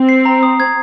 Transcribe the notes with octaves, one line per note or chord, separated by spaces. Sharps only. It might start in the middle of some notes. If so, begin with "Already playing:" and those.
Already playing: C4
C7
A#5
D#6
G#6